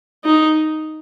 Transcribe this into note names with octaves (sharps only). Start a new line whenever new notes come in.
D#4